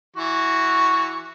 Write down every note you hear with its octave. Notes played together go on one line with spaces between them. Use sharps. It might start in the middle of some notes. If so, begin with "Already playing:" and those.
E3 F#4 C#6